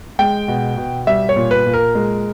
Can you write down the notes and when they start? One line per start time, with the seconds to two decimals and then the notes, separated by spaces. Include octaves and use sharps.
0.19 G#3 G5
0.48 B2
0.77 B2
1.07 G3 E5
1.29 C#5
1.36 A#2
1.51 B4
1.66 A#2
1.74 A#4
1.95 G#3